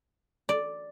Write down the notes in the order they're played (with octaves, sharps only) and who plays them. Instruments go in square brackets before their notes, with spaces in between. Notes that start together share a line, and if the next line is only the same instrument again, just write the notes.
[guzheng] D5